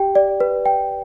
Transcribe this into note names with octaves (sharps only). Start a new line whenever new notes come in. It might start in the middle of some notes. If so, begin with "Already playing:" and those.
Already playing: G4 G5
D5
B4
G5